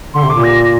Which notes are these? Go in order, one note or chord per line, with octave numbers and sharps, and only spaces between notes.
D3 C6
C3
A#2 D6
A#6